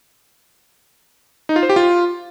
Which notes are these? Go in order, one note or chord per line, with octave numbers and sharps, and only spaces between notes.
D#4
F4
C5
G4
F4